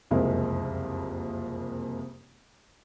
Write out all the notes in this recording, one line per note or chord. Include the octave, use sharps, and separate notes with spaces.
F#1 C2 F2 G#3 A#3 E5